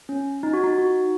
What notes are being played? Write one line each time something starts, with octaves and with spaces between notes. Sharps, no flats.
C#4
D#4
F#4
D#4
F#4